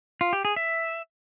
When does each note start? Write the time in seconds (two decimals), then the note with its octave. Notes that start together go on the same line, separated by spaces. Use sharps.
0.21 F4
0.33 G4
0.45 G#4
0.56 E5